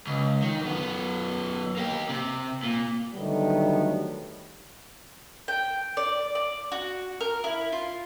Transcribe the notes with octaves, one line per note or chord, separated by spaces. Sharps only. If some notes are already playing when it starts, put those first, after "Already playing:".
C#2
D#3
F#2 B3
A#3 G4
C3
A#2
D3 D#3 F#3 G3 A3 B3
G5
D5
D5
F#4
A#4
E4
F4